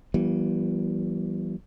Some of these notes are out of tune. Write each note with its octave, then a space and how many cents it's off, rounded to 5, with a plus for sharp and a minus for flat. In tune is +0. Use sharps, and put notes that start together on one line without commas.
E3 +20 G3 -35 B3 -45